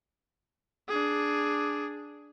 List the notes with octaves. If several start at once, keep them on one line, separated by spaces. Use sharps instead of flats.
D4 G#4